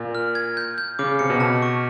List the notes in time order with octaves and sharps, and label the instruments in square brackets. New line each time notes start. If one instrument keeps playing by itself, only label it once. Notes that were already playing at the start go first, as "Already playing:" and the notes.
Already playing: [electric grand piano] A#2
[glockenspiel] F6
G#6
G6
G6
[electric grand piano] C#3 [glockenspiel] D6
[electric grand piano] C3 [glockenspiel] C#7
[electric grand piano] B2
[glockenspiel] A5
C#6